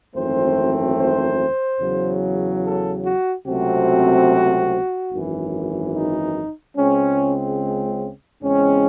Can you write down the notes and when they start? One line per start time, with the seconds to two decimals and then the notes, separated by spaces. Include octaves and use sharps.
0.15 G#1 F#2 E3 A3 C4 C5
0.98 C5
1.80 E2 C#3 F#3
2.63 A4
3.05 F#4
3.46 C#2 C3 F#3 A3 C4 F#4
5.12 G#1 F#2 E3
5.94 D#4
6.77 C#2 C#3 G#3 C4 C#4
8.42 E2 C#3 G#3 C4 C#4